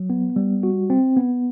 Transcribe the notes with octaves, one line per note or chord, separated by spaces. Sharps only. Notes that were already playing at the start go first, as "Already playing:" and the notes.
Already playing: F#3
B3
G3
F#4
C4
B3